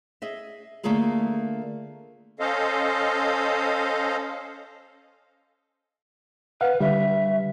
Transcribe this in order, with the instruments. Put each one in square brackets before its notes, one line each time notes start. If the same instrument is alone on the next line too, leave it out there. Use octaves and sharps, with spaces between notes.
[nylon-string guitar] G#4 D#5 E5
D3 A3 A#3 F4 G#4 A#4
[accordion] C#4 A4 C5 D#5 F5
[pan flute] B4 [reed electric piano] F5 F#5
[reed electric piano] D3 G3 [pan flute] E5